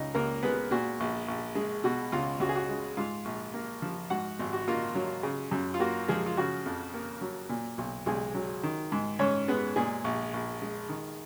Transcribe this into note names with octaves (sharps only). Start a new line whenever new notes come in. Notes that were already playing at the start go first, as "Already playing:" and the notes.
Already playing: C#2 D#4 D#5
C#2 A#3 A#4
G#3 B3 B4
A#2 F#4
A#1
A#1
G#3
B2 F#4
C#2 F4
C#2 F#4
G#4
F#4
G#3
G#2 F4 F5
A#1
A#3
F3
G#2 F#4 F#5
G#1
F#4
A#3 F4
F#3
C#3
F#2
F4
A#3 F#4
F3 G#3 G#4
F4
C#3 F#4
F2
A#3
F#3
A#2
B1
B1 G#3 G#4
F#3
D#3
G#2
G#2 C#4 C#5
G#3 B3 B4
A#2 G#3 G#4
A#1
A#1
G#3
D#3